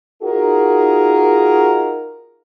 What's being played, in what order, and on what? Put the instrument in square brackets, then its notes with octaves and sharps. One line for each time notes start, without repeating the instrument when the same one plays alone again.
[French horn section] D#4 F4 F#4 G#4 A#4